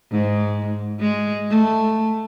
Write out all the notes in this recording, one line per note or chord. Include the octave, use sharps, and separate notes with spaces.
G#2
G#3
A3